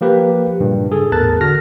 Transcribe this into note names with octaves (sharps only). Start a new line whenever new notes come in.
F3 A#3 G4 B4
G2 A#2 C#3
G#4 A4
A1 E2 A#4 A5 F#6 A6
D3 F#4 F6 A#6